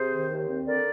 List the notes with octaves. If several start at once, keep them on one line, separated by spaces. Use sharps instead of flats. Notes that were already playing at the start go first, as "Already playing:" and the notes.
Already playing: C3 G#4 C5
D#3
D#2
C4
D3 A#4 D5